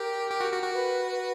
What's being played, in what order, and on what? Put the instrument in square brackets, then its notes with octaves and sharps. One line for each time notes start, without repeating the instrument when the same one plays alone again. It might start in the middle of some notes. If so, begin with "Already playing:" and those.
Already playing: [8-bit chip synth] G4 [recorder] A#4
[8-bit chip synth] G4
F#4
F#4
F#4
[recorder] B4
B4